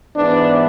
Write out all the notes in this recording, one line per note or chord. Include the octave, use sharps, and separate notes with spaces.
G#2 E3 B3 D4